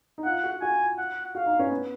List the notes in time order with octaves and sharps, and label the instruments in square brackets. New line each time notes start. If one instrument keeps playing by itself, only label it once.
[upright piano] D#4
[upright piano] F4 [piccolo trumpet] F#5
[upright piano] F#4
[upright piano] F#4 [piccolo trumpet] G#5
[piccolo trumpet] F#5
[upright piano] F#4 [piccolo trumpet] F5
[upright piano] D#4
C#4
B3